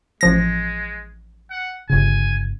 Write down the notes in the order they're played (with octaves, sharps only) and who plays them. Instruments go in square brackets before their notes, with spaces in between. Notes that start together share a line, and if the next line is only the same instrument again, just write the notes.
[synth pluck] A1 F3 A#6 [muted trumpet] G#3
[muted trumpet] F#5
[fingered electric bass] G1 C#3 [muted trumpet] G#5